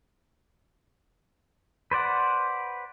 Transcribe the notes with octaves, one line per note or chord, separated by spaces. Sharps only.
B4 C5 D5 F#5